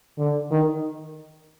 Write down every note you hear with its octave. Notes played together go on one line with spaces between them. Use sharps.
D3
D#3